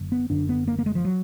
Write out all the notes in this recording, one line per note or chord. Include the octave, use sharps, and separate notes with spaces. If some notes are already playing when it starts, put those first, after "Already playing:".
Already playing: F#1 F#2 D3
B3
F#1 F#2 D3 D4
B3
A#3
A#3
G#3
F3
F#3